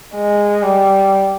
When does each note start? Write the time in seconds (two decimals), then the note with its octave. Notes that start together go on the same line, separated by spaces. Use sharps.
0.15 G#3
0.63 G3